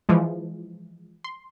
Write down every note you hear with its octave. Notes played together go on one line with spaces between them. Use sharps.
E3 F3 G#3
C6